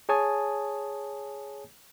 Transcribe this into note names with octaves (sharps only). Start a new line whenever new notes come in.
G#4 C#5 G#5 A5 D#6